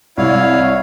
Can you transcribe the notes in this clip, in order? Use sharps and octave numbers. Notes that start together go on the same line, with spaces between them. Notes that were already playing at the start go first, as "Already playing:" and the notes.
C2 E4 C#5 F5